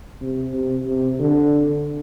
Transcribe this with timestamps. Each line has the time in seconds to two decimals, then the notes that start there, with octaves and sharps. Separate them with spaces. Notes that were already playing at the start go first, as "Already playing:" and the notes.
0.22 C3
0.54 C3
0.86 C3
1.19 D3